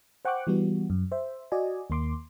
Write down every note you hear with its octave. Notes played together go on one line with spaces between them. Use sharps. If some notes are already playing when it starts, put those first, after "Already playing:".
C5 F#5 G5 C#6 D6 F#6
E3 G3 B3 F#4
F#2
C5 E5
F#4 D5 D#5 G#5
D#2 A#3 C6 D6